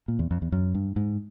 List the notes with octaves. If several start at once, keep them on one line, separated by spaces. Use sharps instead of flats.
A#2
E2
F2
E2
F#2
G2
G#2